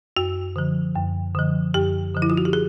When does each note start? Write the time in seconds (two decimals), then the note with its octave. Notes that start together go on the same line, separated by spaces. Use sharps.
0.17 F#2 F#4
0.56 D3 F3
0.95 F#2
1.35 D3 F3
1.74 F#2 G4
2.14 D3 F3
2.22 E4
2.30 F4
2.37 F#4
2.45 G4
2.53 G#4